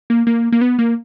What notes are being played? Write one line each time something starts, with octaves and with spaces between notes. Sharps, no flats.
A#3
A#3
A#3
B3
A#3